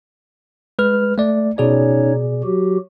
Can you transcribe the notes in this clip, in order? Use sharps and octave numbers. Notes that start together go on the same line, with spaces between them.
G#3 B4 F6
A3 D5
B2 C#4 D#4 G#4 C#5 D5
F#3 F#4 G4